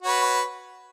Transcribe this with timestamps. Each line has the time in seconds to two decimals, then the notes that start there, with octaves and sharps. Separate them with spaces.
0.02 F#4
0.05 C#5
0.08 B4